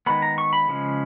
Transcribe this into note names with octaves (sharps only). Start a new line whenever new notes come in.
D#3 G#3 B3 B5
A#5
C#6
B5
C#3 F3 G#3